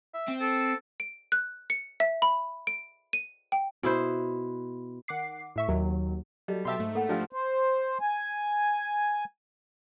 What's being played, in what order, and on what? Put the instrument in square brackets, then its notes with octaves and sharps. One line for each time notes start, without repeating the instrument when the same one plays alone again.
[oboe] E5
[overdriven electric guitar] C4
[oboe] A4
[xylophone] D7
F#6
C#7
E5
B5
D7
D#7
G5
[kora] B2 E4 C5
[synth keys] D#3 F#5 D6 C7
A2 E5 C#6
D#2 D#3 F#3
[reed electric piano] F#3 F#4 A4 [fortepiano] G3 [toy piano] D#5
[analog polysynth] B2 G4 A5 [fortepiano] E5 C6
[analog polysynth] G#2 A3
[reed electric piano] A#3 [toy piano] A4 F#5 B5
[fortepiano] F3 [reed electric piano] D4 G4 F5
[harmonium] C5
G#5